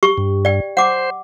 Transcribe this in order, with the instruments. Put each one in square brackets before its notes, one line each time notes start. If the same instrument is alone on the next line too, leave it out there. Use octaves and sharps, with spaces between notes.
[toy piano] G4 C#6
[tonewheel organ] G2
[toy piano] D5 G5
[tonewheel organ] C5 [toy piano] F#5 D6